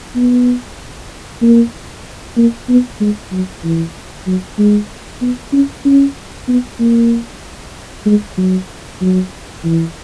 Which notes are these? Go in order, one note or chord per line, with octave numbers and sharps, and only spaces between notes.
B3
A#3
A#3
B3
G#3
F#3
E3
F#3
G#3
B3
C#4
C#4
B3
A#3
G#3
F#3
F#3
E3